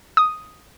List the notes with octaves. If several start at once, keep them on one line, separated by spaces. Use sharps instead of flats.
D#6